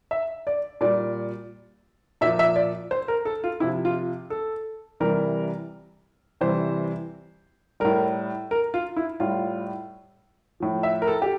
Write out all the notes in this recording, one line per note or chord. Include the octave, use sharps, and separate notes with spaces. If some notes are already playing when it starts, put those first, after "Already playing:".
E5
D5
A#2 G3 D5
A#2 F3 E5
E5
D5
C5
A#4
A4
F4
C3 F3 E4
F4
A4
C3 E3 G3 A#4
C3 E3 G3 C5
A2 G3 A#4
A#4
F4
E4
A2 G3 F4
A2 F3
E5
A#4
A4
G4